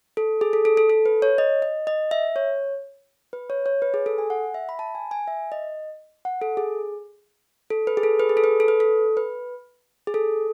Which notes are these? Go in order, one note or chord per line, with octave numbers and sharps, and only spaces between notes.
A4
G#4
A4
A4
A4
A4
B4
C#5
D#5
D#5
D#5
E5
C#5
B4
C#5
C#5
B4
G#4
A4
G#5
F#5
E5
B5
A5
G#5
G#5
E5
D#5
F#5
A4
G#4
A4
B4
G#4
A4
B4
G#4
A4
B4
A4
B4
A4
B4
G#4
A4